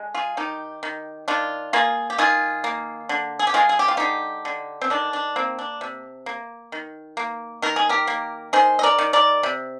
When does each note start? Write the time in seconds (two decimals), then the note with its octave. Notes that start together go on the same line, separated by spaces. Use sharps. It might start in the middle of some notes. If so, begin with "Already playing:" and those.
Already playing: D3 G#3
0.15 F4 G#4
0.37 D#3 D#4 G4
0.83 D#3
1.28 D#3 D4 F4
1.73 A#3 F4 G#4
2.10 G4
2.18 D#3 F4 G#4
2.64 A#3
3.09 D3
3.39 G#4
3.47 G4
3.54 G#3 F4 G#4
3.69 G#4
3.79 G4
3.88 F4
3.97 D3 D#4 G4
4.45 D3
4.81 C4
4.90 D#3 D4
5.13 D4
5.36 A#3 C4
5.59 D4
5.81 C3
6.26 A#3
6.72 D#3
7.17 A#3
7.62 D#3 A#4
7.76 G#4
7.89 G4 A#4
8.07 A#3
8.53 D#3 G#4 C5
8.79 D#5
8.83 A#4 D5
8.99 D#3
9.13 A#4 D5
9.43 C3